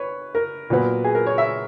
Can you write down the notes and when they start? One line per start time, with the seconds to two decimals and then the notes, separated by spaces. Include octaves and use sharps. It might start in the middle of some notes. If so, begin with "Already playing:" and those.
Already playing: B4 C#5
0.35 A#4
0.70 A#2 F#3 B3
1.04 G#4
1.15 A#4
1.26 C#5
1.38 E5